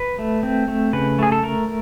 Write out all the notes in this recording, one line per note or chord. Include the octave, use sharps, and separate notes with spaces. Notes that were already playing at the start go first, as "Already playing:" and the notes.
Already playing: B4
A3
C4
A3
C#3 B4
A3 G#4
A4
A3 A#4